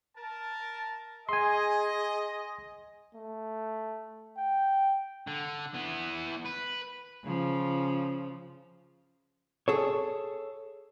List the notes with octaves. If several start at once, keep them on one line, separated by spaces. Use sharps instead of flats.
A#4 A5
G#4 D#5 G#5 C6
A3
G5
D3
E3 B3
B4
C#3 F3
G#4 A4 C#5